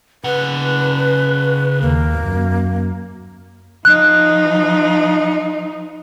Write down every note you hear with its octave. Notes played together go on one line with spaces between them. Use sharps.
C#3 B4 F#5
D#2 A#3
F#2
F3 D#4 F#6